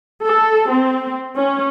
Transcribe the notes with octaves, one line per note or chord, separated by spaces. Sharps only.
A4
C4
C#4